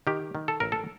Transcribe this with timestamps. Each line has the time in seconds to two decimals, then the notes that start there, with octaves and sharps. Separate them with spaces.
0.07 D#3 G4
0.35 D#3
0.48 A4
0.60 A1 A#4
0.72 A4